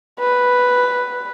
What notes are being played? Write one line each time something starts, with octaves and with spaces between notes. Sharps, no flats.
B4